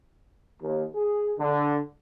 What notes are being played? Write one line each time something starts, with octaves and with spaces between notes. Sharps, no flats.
D#2
G#4
D3